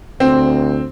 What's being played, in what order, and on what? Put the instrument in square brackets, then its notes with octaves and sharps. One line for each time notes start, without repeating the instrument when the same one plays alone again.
[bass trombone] D2 [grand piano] C4